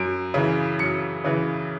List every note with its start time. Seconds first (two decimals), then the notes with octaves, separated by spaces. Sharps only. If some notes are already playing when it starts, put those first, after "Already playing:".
Already playing: F#2 D7
0.34 C#3 E3
0.79 F#2 C#7
1.24 C#3 E3